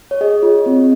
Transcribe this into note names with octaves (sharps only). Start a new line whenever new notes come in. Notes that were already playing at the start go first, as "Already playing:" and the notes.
C#5
G#4 D#5
F4
C4